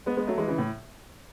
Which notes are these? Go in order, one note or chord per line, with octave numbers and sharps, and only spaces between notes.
G#3 B3
G#3 B3
F#3 A3
E3 G#3
C#3 E3
A2